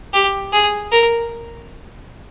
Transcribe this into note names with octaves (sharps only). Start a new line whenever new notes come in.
G4
G#4
A#4